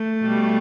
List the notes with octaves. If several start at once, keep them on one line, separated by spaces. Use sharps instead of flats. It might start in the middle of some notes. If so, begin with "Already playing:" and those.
Already playing: A3
B2 G3